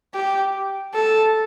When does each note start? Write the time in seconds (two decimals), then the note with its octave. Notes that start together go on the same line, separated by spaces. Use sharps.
0.14 G4
0.94 A4